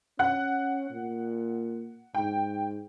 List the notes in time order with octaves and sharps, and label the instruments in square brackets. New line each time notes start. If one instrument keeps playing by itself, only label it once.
[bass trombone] C#4 [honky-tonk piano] F#5 F#6
[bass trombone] A#2
[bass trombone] G#2 [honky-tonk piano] G5